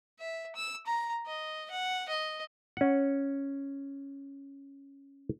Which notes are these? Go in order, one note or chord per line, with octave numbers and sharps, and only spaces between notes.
E5
E6
A#5
D#5
F#5
D#5
C#4 F#5